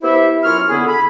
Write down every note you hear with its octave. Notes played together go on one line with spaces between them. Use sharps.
B3 E4 G4 C5 E5
F#2 E4 F4 C#5 C#6 F6
D3 B3 E4 G#4
B5